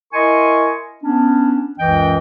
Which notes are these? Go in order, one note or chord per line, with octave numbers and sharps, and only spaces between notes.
E4 A#4 D#5 G#5 C6 C#6
B3 C#4 D4
C#2 F#2 E3 D#5 G5